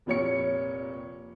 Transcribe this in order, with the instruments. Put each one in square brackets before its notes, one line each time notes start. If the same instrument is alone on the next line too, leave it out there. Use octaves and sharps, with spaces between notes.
[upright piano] F1 A#2 C#5 C#7